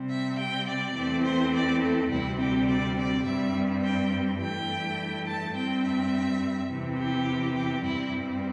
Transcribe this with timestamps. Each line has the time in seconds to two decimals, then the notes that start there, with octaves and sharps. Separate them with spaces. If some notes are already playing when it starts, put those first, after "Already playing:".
Already playing: C3 G3 C4
0.09 E5
0.38 G5
0.67 D5
0.96 E2 E3 A3 C4
1.24 C5
1.53 D5
1.82 A4
2.10 D2 C3 G3 C4 E4
2.39 G4
2.68 D5
2.97 D5
3.25 G2 G3 C4 E5
3.83 G5
4.40 G2 E3 A3 G5
5.26 A5
5.55 G2 G3 C4 G5
5.83 E5
6.70 E2 C3 E3
6.98 G4
7.55 G4
7.84 G2 G3 C4 E4